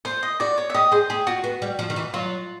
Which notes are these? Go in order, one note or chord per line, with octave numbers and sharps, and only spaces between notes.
F4 C5
D#5
F#4 D5
C#5
E5
G4 D#5
G#4 C5
G4 G#4
F4 F#4
B3
G3
F3
D#3
E3
F#3 F4